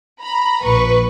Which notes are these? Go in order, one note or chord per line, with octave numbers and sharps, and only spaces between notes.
A#5 B5
A#1 B4 C#6